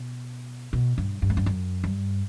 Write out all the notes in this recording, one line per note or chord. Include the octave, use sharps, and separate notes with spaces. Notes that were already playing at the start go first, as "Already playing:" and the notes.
Already playing: B2
B2
G2
G2
F#2
G2
F#2
G2